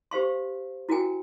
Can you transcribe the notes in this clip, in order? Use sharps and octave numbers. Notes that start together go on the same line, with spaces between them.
G4 C5 F5 C6
E4 F#4 A#4 G5 G#5